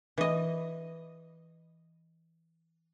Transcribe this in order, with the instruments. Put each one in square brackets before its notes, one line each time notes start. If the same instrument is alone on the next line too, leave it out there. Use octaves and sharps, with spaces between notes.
[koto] E3 D#5